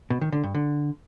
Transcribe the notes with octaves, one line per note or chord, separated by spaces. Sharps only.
B2
D#3
D3
G2
D3